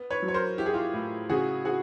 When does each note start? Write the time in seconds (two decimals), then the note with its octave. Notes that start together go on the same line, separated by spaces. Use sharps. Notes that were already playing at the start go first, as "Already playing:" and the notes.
Already playing: B3
0.10 B4 C#5
0.22 F#3
0.28 C#5
0.34 A#4 C5
0.58 E4 G4
0.66 G#4
0.74 F4 G4
0.94 A2
1.29 C#3 F#4 G#4
1.65 F#4 G#4